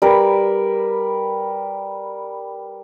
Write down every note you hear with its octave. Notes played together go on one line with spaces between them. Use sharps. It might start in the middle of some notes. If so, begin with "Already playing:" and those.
G3 A#4 B4